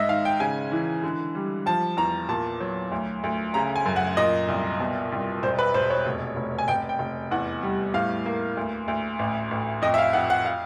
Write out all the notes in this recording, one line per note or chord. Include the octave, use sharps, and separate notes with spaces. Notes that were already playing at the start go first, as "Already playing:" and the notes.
Already playing: G#2 D#5 E5
D#3 F5
G5
C#3 G#5
E3
D3
G3
F3 A5
E2 A#5
A#2 A5
F#3
D2
D2
C#3 A#5
G#5
F#2
F#5
A#2 D#5
C2
B2
C2
E1 C5
B4
E1 C5
C#5
F1
F1
G#5
F1 G5
G5
F1
E2 F#5
G3
A2 F5
A#3
D2
D2
A1
A1
F2 D#5
E5
F5
F2 F#5
F#5
F5